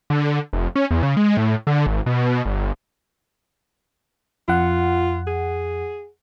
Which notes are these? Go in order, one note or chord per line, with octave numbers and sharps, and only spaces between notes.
D3
F1
C#4
E2
C#3
G#3
A2
D3
G#1
B2
G1
F2 F4 F#5
G#4